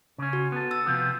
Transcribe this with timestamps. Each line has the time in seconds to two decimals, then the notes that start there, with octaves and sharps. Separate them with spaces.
0.18 C#3 C#4
0.33 F#4
0.52 B3 A4
0.71 E6 A6
0.86 C3 F3 B3